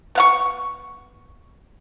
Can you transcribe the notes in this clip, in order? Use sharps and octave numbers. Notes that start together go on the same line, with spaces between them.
B3 F5 C#6